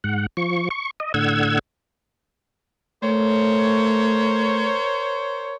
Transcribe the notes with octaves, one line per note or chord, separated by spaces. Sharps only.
G#2 F#5
F3 C#6
C#6
D#5
A2 D3 F#5 E6 G#6
A3 A#4 C5 C#5